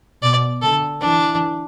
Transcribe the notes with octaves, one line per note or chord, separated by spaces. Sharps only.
B2 D5
D3 A4
E3 D4